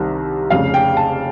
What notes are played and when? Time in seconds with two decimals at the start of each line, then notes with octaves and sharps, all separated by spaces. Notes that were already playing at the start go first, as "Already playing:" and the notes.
Already playing: C2 C3 D#3 G3 C4
0.50 F1 F2 C#3 F5
0.74 G5
0.97 A5